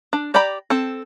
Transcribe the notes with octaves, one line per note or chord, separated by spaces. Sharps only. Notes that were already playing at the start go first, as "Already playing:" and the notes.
D4
G4 D5 G5 A#5 B5
C4 A4